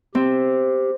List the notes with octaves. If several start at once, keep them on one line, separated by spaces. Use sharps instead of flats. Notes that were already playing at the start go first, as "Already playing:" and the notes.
C4 G4